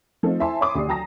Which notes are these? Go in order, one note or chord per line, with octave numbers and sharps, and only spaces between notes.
F3 A3 C4 D#4 F4 A4
E4 C5 E5 G#5 A5 C6
C#5 E5 B5 C6 D6 D#6
D2 G4 D5 C7
F#3 G5 A5 A#5 D#6 A#6